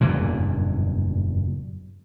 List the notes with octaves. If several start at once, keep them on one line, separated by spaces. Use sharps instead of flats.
F#1 E2 G2 A#2